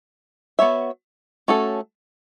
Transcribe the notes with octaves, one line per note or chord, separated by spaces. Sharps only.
B3 F#4 C#5 E5
A3 C#4 F#4 A4